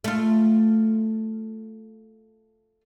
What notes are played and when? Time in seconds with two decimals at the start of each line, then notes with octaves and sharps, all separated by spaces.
0.04 A3 F4